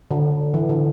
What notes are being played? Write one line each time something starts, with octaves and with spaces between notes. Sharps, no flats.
D3
E3
D3